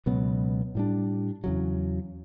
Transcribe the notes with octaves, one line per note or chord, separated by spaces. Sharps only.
C#2 B2 F#3 B3
A2 G3 D4
E2 C#3 F#3